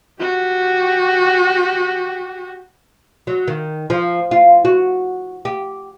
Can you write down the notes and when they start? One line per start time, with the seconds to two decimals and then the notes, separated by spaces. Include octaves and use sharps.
0.20 F#4 G4
3.27 F#3
3.48 D#3
3.90 F3
4.31 F4
4.65 F#4
5.45 G4